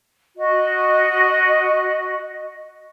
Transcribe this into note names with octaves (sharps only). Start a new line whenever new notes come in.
F#4 D#5